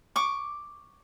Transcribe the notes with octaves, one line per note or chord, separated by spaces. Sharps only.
C#6 D6